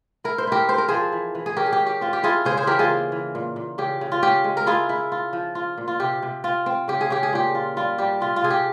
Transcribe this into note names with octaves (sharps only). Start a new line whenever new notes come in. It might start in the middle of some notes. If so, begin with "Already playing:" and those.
E4 A#4
C5
E4 G4 A#4
C4 C5
A#4
F3 G#4 C5
E3
E3
G#4
C#4 G4 A#4
G#4
G4
C#4
G4
C4 F4
G4
E4 F4 G#4
C#3 G#4 C5
G#4 C5
E3 G4 A#4
F4 G#4
A#3
E3
A#2
A#2
C#3 G4
C#3
F4
C#4 G4
G#3
A#4
E4 F4 G#4
E4
F4
F3
F4
A#2
F4
C3 G4
C3
C4 F4
C4
C#3 G4
G#4
C#3 G4
G#4
A#2 G4
F4
G3 F4
G3 G4
C3 F4
F4
C3 G#4
G4